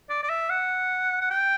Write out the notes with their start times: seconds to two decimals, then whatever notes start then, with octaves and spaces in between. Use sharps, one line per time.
0.10 D5
0.23 D5
0.29 E5
0.50 F#5
1.21 F#5
1.30 G5